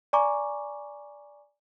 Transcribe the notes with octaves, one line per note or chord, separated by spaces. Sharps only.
D5 G#5 A#5 C#6 D6